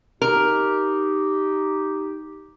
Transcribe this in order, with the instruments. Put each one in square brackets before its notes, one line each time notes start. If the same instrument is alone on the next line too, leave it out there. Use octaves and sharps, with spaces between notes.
[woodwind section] D#4 G4 [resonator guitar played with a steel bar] A#4